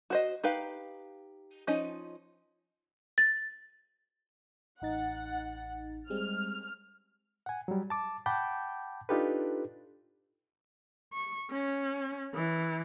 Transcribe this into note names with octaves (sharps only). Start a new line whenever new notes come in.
F#4 C5 D#5
D#4 G4 B4 F5
F3 C#4 D#4 D#5
A6
A1 D#4 F#5 A6
G3 G#3 C4 F6
F#5 G#5
F#3 G3
A5 D6
F#5 G5 A5 B5 D6 G6
D4 D#4 F4 G4 A4 B4
C#6
C#4
E3